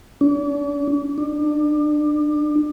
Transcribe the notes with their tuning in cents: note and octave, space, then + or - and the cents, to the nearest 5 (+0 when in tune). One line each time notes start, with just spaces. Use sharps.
D4 -40
D4 +30